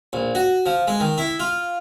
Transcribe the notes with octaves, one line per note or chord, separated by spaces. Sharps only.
A#1
F#4
F3
G#3
D#3
E4
F4